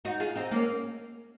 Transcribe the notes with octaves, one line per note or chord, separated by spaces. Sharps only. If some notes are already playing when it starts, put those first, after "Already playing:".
D#4 F#4
F4 G#4
C4 D#4
A#3 C#4